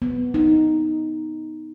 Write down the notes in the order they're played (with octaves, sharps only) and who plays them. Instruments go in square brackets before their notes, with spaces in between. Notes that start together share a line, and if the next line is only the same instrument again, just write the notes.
[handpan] B3
D#4